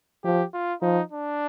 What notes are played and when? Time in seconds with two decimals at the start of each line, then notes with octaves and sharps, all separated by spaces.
0.24 F3 G4
0.54 F4
0.82 F3 D#4
1.12 D4